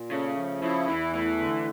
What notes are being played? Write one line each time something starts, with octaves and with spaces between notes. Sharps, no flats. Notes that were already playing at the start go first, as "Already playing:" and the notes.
Already playing: A#2
C#3 A3
F3
C#3 E4
E2 E3
E3 A3
D3